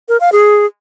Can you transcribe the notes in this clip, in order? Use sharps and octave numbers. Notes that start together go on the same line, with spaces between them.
A#4
F5
G#4